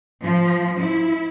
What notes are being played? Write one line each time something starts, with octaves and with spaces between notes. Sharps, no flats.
F3
E4